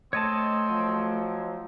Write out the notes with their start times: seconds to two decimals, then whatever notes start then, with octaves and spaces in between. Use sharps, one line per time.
0.13 A3 C4 C#5 D#5 A5
0.68 F3 F#3